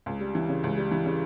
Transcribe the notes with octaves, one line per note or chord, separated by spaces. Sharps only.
C#2
G3
E3
C#3
C#2
G3
E3
C#3